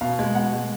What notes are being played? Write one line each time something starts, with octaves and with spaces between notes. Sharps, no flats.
B2 F5
G#3
B2 F#5
G#3